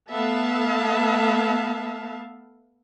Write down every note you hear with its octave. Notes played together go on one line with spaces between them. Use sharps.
A3 B3 E5 F5 A5